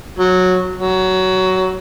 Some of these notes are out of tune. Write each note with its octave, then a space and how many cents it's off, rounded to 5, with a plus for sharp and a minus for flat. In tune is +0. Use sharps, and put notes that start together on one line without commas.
F#3 -10
F#3 +15